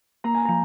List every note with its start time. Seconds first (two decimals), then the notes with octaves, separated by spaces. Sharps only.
0.24 A#3 A#5
0.35 G#5
0.45 F3 A#5